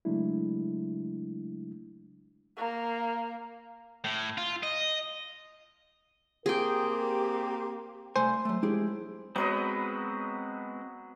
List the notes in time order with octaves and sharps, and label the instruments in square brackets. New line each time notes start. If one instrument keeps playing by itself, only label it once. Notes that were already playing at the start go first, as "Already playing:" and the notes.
[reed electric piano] C#3 F#3 G#3 A3 D4 E4
[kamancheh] A#3 A#5
[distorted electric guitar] A2
F4
D#5
[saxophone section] A#3 C4 G4 [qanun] G#4 G5 [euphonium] A#4
[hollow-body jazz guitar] C2 A3 G#5 [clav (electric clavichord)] C5
[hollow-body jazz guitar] F#3 A3
[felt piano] G#3 [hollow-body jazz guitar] E4 G4 G#4
[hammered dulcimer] F#3 B4 D#5 [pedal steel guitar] G#3 B3 C4